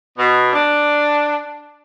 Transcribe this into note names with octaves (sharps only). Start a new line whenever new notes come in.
B2
D4